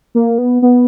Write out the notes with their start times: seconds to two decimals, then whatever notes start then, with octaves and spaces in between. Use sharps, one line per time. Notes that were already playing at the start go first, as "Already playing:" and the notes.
0.15 A#3
0.38 B3
0.62 B3